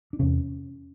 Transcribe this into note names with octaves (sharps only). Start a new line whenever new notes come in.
D4
E2 C3 C#4